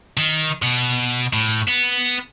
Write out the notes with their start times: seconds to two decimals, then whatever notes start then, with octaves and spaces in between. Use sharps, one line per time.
0.17 D#3
0.62 B2
1.33 A2
1.68 B3